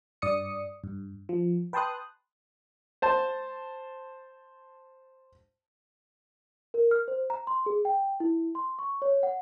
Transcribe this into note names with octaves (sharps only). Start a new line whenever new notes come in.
G2 D5 D#6 C#7
G2
F3
B4 G5 A5 C6 D#6 F#6
C5 A5
A#4
F6
C5
A#5
C6
G#4
G5
E4
C6
C#6
C#5
F#5